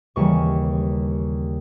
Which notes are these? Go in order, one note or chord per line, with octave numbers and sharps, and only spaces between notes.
D#2 C#3 E3 G3 C#6